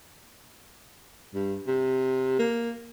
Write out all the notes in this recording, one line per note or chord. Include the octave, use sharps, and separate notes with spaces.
G2
C3
A#3